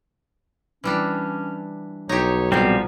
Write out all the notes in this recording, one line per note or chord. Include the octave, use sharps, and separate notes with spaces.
E3 G3 C#4 D4
B1 D#4 G4 C#5
A#2 C#3 F3 G3 B3 C4